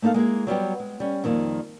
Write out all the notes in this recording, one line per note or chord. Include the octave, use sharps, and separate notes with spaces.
A3 A#3 D#4 A4 F5
G#3 A#3 E4 G#4
F#3 G3 B3 G4
G#3
G3 C#4
F2 D#3 G3 A3 A#3